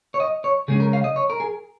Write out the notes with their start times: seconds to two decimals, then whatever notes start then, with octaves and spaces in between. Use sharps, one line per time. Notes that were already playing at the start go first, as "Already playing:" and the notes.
0.14 C#5
0.20 D#5
0.44 C#5
0.68 C#3 G#3 C#4 G#4
0.80 A#4
0.93 F5
1.04 D#5
1.16 C#5
1.30 A#4
1.40 G#4